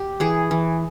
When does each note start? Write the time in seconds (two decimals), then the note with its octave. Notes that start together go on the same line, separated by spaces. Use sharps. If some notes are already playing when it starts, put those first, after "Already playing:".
Already playing: G4
0.20 E3 G#4
0.51 E3